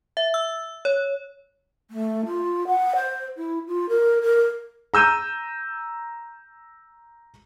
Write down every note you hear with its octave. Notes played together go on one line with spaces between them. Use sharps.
E5
E6
C#5
A3
F4
F#5
C5
E4
F4
A#4
A#4
A#5 E6 G6 D#7